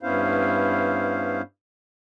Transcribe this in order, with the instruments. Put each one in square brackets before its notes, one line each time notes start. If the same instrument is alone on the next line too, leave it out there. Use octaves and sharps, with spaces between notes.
[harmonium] G2 B3 C#4 E4 C5 F5